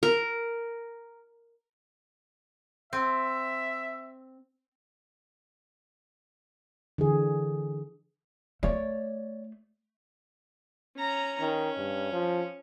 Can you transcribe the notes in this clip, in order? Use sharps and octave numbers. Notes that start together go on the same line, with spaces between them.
A#4
C4 E5
D3 E3 G#4
A3 C#5 D5
C#4 A#5
D#3 C#4
G2
F3